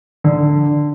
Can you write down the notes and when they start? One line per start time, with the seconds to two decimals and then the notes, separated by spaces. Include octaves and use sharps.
0.24 D3